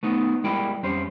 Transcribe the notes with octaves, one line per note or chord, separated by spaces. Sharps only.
A3 B3 D#4
G3 G#3 E4 A#4 G5
F2 G3 C#4 G4 C5